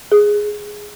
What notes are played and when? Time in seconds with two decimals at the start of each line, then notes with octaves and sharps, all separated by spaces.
0.12 G#4